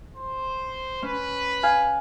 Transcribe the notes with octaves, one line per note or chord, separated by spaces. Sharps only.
C5
C#4 B4
F5 G#5 F6